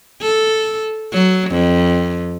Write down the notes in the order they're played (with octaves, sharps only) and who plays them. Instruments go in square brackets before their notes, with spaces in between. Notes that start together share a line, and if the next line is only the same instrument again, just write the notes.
[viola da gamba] A4
F#3
F2